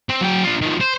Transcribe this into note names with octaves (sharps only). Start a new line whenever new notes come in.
C4
F#3 G5
D4 F4
D#3 F3
C5